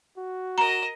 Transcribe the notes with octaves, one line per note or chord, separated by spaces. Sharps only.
F#4
A#4 D#5 A#5 E7